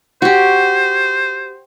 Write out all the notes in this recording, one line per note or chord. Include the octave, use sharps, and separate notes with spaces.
F#4 G4 C5